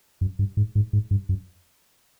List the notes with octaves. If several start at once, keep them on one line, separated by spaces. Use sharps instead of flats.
F#2
G2
G#2
G#2
G#2
G2
F#2